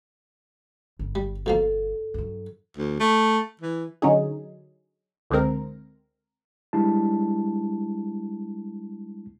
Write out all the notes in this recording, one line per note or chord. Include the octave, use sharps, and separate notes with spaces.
G1
G3
B2 F3 A#3 A4
G2 F#3
D2
A3
E3
D3 F#3 C#4 D#4 G#4
C#2 D3 G#3 C4 A#4
G3 G#3 D4 E4 A5